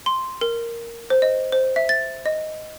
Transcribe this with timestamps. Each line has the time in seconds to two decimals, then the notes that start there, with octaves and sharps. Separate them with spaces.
0.06 C6
0.41 A#4
1.10 C5
1.22 D#5
1.52 C5
1.76 E5
1.89 A6
2.26 D#5